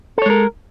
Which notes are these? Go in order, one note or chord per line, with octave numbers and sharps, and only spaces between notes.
G#3 A4 A#4 C#5